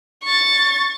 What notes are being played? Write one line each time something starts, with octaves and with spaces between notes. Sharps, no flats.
C#6 A6